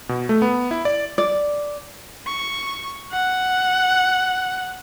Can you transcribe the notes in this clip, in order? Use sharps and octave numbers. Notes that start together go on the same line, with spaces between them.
B2
A3
B3
E4
D5
D5
C#6
F#5